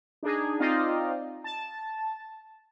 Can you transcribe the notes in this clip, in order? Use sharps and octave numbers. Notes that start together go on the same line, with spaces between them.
D4 D#4 G#4
C4 D#4 F4 D5 D#5 F5
A5